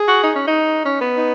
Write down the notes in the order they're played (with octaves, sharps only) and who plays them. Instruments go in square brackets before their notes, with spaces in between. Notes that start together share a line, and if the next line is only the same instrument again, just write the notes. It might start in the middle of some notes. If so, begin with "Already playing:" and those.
Already playing: [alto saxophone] G#4
[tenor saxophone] F#4
D#4
C#4
D#4
C#4
B3
[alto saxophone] D#4